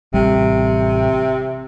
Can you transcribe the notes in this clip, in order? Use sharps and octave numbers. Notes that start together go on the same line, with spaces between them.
A1 C3 G3